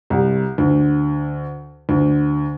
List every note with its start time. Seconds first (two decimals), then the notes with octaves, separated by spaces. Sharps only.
0.10 C2
0.58 D2
1.89 D2